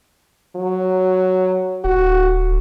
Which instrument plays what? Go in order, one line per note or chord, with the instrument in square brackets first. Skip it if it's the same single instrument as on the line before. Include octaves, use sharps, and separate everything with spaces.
[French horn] F#3
[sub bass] D1 [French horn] F#4